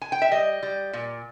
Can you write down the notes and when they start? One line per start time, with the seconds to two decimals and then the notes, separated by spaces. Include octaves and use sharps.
0.01 G#5
0.12 G5
0.22 E5
0.32 G3 D#5
0.63 G3
0.93 A#2